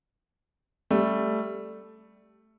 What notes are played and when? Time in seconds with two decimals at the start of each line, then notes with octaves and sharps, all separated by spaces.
0.91 G3 A3